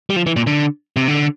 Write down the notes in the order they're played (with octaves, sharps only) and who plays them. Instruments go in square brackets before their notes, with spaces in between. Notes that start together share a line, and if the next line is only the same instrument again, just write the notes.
[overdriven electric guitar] G3
F3
E3
A#2
D3
C3
D3